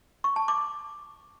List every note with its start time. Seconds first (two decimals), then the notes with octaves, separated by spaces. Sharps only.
0.24 C#6
0.36 A5
0.48 D6